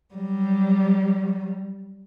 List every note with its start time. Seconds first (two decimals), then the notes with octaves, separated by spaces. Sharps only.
0.15 F#3 G3